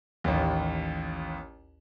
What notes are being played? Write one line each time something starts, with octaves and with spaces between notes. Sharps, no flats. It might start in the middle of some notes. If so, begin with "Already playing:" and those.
A1 D#2